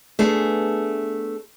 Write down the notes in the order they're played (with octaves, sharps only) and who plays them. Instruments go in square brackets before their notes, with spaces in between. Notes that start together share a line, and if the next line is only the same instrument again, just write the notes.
[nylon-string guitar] A3 B3 D4 G#4